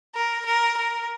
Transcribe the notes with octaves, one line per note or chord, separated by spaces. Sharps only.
A#4
A#4
A#4